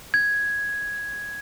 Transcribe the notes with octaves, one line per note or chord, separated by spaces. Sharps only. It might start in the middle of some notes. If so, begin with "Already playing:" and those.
G#6